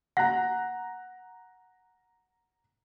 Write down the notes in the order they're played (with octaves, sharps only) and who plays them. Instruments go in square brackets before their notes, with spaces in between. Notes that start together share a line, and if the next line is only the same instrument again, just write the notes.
[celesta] F#5 [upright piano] A#5 F#6 A#6